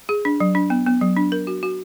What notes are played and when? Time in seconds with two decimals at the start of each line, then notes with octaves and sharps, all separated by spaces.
0.09 G#4
0.25 D4
0.40 F#3
0.55 D4
0.70 B3
0.86 B3
1.01 F#3
1.17 D4
1.32 A#4
1.47 F#4
1.63 F#4